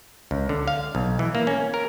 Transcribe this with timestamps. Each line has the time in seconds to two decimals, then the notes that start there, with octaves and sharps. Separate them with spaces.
0.31 C#2
0.49 D3
0.68 F5
0.95 B1
1.19 E3
1.35 A#3
1.47 C#4
1.74 A#4